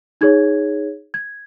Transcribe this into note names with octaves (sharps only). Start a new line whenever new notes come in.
D#4 G#4 C#5 G#6
G#6